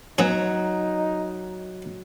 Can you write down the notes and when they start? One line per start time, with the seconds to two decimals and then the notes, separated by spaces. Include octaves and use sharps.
0.18 F#3 B3 C#4 D#4